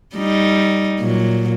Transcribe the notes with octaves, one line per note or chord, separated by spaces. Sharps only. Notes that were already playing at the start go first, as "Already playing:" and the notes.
G3 D#4
A#2 F#3